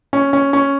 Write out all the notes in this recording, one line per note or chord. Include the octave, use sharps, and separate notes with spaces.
C#4
C#4
C#4